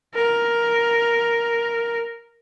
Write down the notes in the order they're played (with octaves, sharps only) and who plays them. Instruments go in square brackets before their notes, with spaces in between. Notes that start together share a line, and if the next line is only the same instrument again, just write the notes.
[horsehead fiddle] A#4